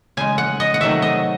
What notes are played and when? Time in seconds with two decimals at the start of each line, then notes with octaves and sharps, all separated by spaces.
0.17 C#3 G#3 G#5
0.38 F#5
0.60 D#5
0.74 F#5
0.81 C3 D#3 F#3 A3 E5
1.02 D#5